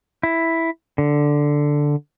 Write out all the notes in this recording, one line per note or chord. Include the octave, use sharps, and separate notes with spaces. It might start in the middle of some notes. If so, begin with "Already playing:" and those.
E4
D3